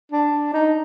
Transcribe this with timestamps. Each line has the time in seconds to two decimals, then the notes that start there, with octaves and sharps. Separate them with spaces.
0.12 D4
0.54 D#4